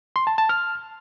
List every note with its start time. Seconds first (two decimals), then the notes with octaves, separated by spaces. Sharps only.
0.16 C6
0.27 A5
0.38 A5
0.49 F6